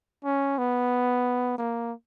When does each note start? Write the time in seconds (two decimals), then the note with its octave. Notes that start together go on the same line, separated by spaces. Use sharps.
0.24 C#4
0.58 B3
1.58 A#3